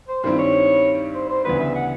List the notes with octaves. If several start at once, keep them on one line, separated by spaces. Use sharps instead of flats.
C5
G2 D#3 G3 C4 E4 C5
C#5
C5
C5
D2 C#3 E3 G3 B3 B4
E5
F#5